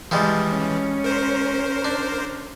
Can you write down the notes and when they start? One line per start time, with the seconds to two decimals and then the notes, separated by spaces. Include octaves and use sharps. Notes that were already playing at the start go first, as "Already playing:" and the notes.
0.11 E3 F3 G3 G#3
0.49 C#4
1.04 A#4 C5
1.85 D4